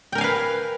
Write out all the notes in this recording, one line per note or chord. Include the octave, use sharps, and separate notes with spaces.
A#4 B4 F5 G5 G#5